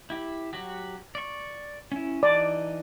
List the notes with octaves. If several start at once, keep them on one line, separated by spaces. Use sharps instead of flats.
E4 G4
F#3 F#4 G4
D5 C#6
C#4 E4
E3 D#4 D5